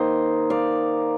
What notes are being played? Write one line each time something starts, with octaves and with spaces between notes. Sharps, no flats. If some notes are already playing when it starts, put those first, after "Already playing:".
Already playing: D#3 A#3 D#4 C5 D#5
D5 F5